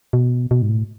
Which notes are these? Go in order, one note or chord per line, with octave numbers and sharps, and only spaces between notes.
B2
B2
G#2
A2